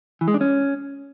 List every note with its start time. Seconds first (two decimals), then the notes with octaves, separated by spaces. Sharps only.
0.21 E3
0.28 G#3
0.34 D4
0.41 C#4